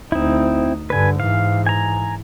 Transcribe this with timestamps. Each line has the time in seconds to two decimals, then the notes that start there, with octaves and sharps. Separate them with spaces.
0.12 D2 C4 D#4 E4
0.90 G2 D3 B4 G#5
1.20 G#2 E3 F5
1.66 G#5 A#5